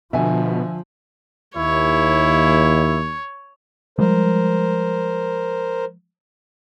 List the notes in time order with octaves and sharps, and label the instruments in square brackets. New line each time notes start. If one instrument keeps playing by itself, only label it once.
[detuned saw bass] B2 [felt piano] D3 [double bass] F3 [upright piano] E5 G#5
[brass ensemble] D#2 [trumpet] E4 [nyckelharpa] C#5
[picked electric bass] F3 G3 G#3 [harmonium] A#4 C5